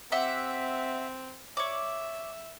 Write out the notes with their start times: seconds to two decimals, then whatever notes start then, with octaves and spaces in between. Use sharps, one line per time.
0.12 C4 G4 E5 F#5
1.57 C#5 D5 E5